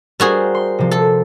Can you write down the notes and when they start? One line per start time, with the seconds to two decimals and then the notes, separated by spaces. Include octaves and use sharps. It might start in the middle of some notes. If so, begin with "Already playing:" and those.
0.20 G3 F#4 G#4 A#4 C5
0.55 C6
0.79 C3 F3
0.91 A4